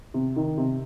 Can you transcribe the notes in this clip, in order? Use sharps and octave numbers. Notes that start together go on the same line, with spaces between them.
C3
D#3
C3